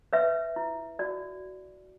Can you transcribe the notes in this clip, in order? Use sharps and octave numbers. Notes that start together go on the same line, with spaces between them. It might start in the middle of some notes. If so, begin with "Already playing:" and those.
B4 C#5 E5
E4
F#4 D5